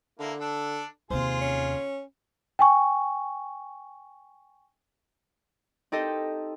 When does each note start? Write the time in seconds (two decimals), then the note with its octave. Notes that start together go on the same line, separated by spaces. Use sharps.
0.19 D3 A#3 E4 A4
0.40 D4 A4
1.10 D#2 C3 F4 G#4 C5
1.41 C#4
2.59 G5 G#5 C#6
5.92 C4 D#4 G4 A4 D#5